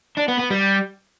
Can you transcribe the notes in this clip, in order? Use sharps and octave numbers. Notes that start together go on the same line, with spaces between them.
D4
B3
B3
G3